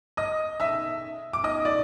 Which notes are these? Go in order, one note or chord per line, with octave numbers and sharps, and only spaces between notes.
D#5 D#6
E5 E6
D6
D#5 D#6
D5 D6